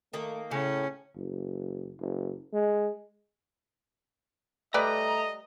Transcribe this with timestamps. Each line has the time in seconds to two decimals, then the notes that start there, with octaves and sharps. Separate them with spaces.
0.13 D#3 A3 A#3
0.51 A2 C#3 C#4
1.16 F#1
1.99 F#1
2.54 G#3
4.74 G3 A3 B4 D5 D#5 A#5